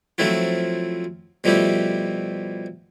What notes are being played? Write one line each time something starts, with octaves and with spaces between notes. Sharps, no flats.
F3 F#3 A3 C4 E4 F4
B2 F3 G3 A3 E4 G4